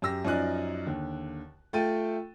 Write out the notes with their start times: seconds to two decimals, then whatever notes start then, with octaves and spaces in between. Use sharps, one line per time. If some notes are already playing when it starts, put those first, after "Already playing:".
0.02 F#2 G4 E6 A#6
0.25 F#2 F3 D#4 D5 G#5 F#6
0.87 D#2 D3
1.73 A3 F4 A4 G5 A6 D#7